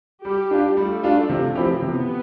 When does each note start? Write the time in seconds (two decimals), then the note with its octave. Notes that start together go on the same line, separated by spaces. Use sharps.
0.25 G3 G4
0.51 D4 F4
0.77 G3 A3
1.03 D4 F4
1.29 C3
1.55 F3 C4 E4 G4
1.82 C3 B3